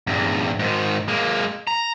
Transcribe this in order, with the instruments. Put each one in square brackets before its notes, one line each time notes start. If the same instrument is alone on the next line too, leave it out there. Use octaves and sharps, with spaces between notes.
[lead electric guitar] E2 G2
G#2 D#3
G#3 A#3
A#5